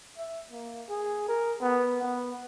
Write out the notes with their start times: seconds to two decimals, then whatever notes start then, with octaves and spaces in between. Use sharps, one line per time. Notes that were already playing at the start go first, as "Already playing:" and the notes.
0.18 E5
0.51 A#3
0.89 G#4
1.28 A#4
1.61 B3
2.02 B3